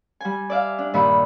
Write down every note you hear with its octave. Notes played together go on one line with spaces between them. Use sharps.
G3 G#5
D5 E5 F5
D4
G2 A#2 D#3 E5 B5